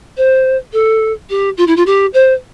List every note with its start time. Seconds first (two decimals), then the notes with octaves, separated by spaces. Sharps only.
0.17 C5
0.73 A4
1.30 G4
1.57 F4
1.67 E4
1.76 F4
1.86 G4
2.14 C5